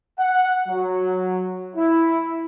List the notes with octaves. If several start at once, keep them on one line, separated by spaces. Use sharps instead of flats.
F#5
F#3
E4